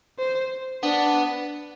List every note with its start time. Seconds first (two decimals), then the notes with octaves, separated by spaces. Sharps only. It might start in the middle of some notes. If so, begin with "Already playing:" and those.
0.19 C5
0.83 B3 D4